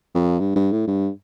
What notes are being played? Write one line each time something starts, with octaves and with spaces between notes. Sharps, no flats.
F2
G2
G2
A2
G2